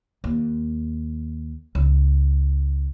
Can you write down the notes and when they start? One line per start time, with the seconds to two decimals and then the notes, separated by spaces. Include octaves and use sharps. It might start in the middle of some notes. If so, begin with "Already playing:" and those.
0.24 D#2
1.75 C#2